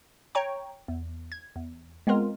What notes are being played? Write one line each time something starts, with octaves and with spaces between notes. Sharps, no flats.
C#5 G5 A#5 C#6
E2
G#6
E2
G#3 B3 C4 F4 A#4